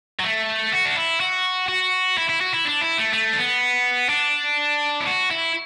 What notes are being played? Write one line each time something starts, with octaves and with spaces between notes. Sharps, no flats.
F#3
A3
F#4
D4
E4
F#4
F#4
E4
E4
F#4
E4
D4
E4
A3
A3
D4
B3
D4
E4
F#4
E4